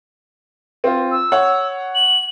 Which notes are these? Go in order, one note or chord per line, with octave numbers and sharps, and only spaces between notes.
C4 F4
E6
C#5 F#5
F#7